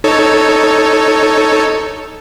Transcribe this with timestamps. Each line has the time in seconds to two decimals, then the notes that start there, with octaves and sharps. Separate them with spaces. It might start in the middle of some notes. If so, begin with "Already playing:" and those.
0.04 D#4 A4 C#5